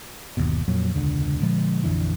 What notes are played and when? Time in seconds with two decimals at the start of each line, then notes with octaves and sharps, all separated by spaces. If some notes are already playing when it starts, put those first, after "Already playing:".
0.37 G1 D#2 B2
0.68 F2 A#2 F#3
0.94 E1 C#2 D3
1.43 A#2 D3 F3 G#3
1.84 A#1 F2 D3 E3